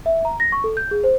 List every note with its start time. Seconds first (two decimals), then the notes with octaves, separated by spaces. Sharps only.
0.06 E5
0.25 A#5
0.40 A#6
0.52 C#6
0.64 A4
0.77 G6
0.91 G#4
1.04 C5